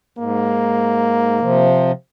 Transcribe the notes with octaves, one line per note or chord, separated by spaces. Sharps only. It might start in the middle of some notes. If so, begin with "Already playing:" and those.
G#2 A#3
C3 F3